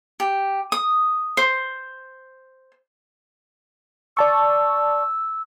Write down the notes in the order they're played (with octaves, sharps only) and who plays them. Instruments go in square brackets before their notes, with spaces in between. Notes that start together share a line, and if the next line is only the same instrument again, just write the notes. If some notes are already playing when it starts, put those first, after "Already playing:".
[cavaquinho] G4
D#6
C5
[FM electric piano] D5 A5 C#6 [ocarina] E6